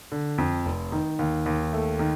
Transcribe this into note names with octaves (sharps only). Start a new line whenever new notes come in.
D3
F2
F1
D#3
D#2
D#2
A3
D#3